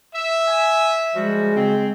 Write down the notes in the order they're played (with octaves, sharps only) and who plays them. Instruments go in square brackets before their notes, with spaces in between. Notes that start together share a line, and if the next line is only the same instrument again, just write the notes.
[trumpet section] E5
[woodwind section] G#5
[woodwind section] F3 G3 F#4 [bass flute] G#3
[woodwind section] C#3 C4